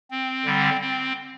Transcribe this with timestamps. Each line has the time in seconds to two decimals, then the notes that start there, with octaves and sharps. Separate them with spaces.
0.11 C4
0.45 D3 G3
0.81 C4